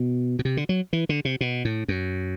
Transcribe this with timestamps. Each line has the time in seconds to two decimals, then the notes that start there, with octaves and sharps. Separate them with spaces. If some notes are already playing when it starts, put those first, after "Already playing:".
Already playing: B2
0.39 B2
0.45 C3
0.57 D3
0.69 F#3
0.93 E3
1.09 D3
1.25 C3
1.41 B2
1.65 A2
1.88 F#2